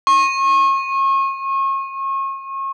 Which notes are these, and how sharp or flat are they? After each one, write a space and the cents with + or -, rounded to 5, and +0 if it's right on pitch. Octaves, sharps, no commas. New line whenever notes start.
C#6 -35